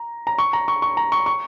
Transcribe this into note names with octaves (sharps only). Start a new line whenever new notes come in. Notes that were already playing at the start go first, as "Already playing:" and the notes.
Already playing: A#5
A#5
C#6
A#5
C#6
C#6
A#5
C#6
C#6